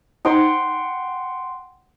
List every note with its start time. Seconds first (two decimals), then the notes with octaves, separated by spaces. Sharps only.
0.25 D#4 C5 F#5 G5 C6